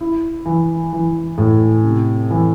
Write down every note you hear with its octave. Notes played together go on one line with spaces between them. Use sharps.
E4
E3
E3
A2
C3
E3